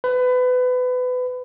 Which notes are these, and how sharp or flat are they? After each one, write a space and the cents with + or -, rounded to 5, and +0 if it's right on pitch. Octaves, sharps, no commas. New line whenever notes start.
B4 +25